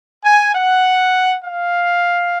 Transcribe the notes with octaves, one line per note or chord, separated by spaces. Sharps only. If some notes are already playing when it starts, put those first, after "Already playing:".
G#5
F#5
F5